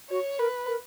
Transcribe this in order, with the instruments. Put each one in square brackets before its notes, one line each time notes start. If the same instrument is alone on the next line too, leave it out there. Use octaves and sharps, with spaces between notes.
[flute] F#4 [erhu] C#5
[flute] A#4 [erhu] B4
[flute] A#4